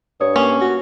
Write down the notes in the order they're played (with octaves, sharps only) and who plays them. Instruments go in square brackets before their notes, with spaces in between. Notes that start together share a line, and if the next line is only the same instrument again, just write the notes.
[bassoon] G2 [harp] C#5 D#6
[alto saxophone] A#3 [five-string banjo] C#4
[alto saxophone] F#4